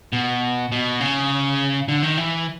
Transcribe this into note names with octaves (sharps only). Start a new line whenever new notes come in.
B2
B2
C#3
D3
D#3
E3